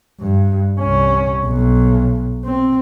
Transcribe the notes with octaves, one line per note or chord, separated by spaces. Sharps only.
G2
C2 C#4
B1
C4